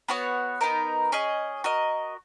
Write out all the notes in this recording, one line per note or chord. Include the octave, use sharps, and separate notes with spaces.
B3 F#4 C#5 F#5
B3 D#4 A#4
C#4 G#4 D#5
F#4 A#4 D#5